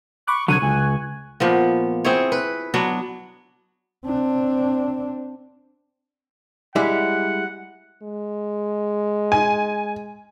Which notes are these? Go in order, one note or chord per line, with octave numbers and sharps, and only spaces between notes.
B5 C#6 D6 F#6
C2 D3 F#3 C#6 F#6 G#6 D#7
C#2 G#5
A#2 F3 B3
C4 E4 G#4 C#5
B4
F#3 B3 D4
C4 D4
G3 G#3 E4 F#5
G#3
G#5